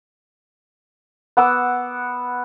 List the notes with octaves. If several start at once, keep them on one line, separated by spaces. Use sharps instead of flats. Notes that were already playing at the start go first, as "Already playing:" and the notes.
B3 F#5 D6 E6